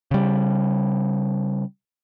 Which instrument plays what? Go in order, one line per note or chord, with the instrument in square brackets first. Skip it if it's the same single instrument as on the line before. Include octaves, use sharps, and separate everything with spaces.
[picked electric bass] C#3 G3